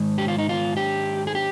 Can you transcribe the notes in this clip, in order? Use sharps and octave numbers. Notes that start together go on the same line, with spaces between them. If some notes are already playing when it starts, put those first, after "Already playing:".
Already playing: G#2 D#3 G#3
G4
F4
D#4
F4
G4
G#4
G4